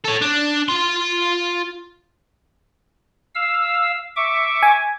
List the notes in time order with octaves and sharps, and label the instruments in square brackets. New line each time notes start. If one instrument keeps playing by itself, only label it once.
[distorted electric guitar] A4 C#5
D4
F4 C6
[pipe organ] F5 E6
E5 C#6 D6
[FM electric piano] G#5